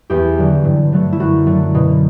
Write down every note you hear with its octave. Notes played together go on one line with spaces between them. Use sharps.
E2 G4
D3 F#3
G2
D3 F#3 A3
E4
F#2 F#4
D3 F#3 A3
B2